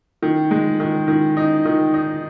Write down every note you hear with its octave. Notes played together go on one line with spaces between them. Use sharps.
D#3
G#3
D#3
D#3
D#4
D#3
D#4